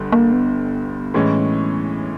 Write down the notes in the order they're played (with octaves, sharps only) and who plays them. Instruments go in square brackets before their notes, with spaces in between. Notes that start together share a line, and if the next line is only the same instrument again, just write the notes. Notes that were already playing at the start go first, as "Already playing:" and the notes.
Already playing: [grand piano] G1 G2 D3
[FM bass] A#3
B3
[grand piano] A2 E3 G#3 C#4